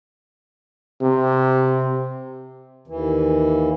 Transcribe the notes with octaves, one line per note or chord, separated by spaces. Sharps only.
C3
D#2 E3